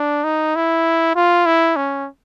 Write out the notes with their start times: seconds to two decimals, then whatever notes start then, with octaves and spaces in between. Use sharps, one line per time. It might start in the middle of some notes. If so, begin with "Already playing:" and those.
Already playing: D4
0.24 D#4
0.56 E4
1.15 F4
1.46 E4
1.76 C#4